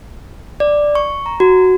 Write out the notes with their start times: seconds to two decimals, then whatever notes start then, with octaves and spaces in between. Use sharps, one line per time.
0.60 D5
0.95 C#6
1.26 A#5
1.40 F#4